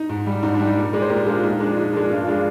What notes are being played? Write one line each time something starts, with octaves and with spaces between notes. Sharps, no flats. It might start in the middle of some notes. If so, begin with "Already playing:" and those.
Already playing: D#4
G#2
G3
G#2 D#4
D4
G3
D#4
A#2
G#3 D5
C5
A#2 G4 A#4
G#3 D4 F4
A#2 D#4
F3 G#3 D4
A#2 D#4
F3 G#3 D4
G2 D4 F4
F3 G#3 D4 F4